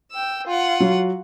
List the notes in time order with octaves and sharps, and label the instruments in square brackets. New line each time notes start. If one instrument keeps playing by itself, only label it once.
[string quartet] G5 E6
F4 F#5
[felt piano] F#3